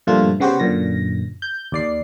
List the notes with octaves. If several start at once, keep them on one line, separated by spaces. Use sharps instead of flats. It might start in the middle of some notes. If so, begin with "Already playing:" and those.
G2 A#2 F3 A3 F4
C#3 B3 F#4 G4 C5
F#2 A#2 D3 A#6
G6
D#2 D5 C7